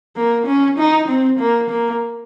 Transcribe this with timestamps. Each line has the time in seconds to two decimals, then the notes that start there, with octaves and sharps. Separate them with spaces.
0.17 A#3
0.47 C#4
0.78 D#4
1.08 C4
1.39 A#3
1.70 A#3